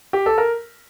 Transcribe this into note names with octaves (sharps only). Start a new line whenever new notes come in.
G4
A4
A#4